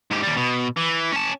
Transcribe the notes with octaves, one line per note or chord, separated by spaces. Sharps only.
G#2 G4
D#2 G3
B2
E3
C#4 A5